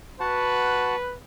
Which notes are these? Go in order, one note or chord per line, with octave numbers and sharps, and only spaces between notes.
F#4 B4 F#5 A5